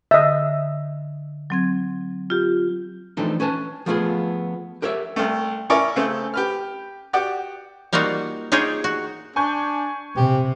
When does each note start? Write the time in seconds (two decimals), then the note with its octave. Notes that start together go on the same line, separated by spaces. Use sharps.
0.11 D3 D#5 E5
1.50 F#3 C4 G#6
2.30 F4 G4
3.17 E3 F3 A3 C4 D4 D#4
3.40 C#4 B4 G#5 A5
3.86 F3 A3 B3 D4 F4 G#4
4.82 G4 A#4 C#5 D5 E5
5.16 C2 A3
5.70 C#4 E4 A#4 C#5 D5
5.96 C#3 A3 C4
6.34 G4 B4 F6
7.13 F#4 G4 D5
7.93 G3 A#3 D#4 F4 F#4
8.52 D#4 F4 G4 G#4 C#5
8.84 F#4
9.36 D4 G#5 C#6 G6
10.17 C3 G4